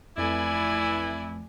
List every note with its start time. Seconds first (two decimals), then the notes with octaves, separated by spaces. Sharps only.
0.17 F2 E3 A3 E4 D5 G#5